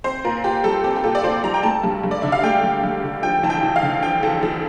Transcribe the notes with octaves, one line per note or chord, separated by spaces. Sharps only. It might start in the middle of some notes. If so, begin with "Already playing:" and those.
C4 C5
A#2 A#4
A#2 G4
G3 A4
C4 G4
G4
A#2 A4
D5
A#2 C5
G3 A#5
G5
A3 A5
G2
G2
D5
D3 E5
F5
A3 G5
G2
G2
D3
F3 G5
E2 A5
G5
E2
F5
D3
F3 G5
E2 A4
E2 A4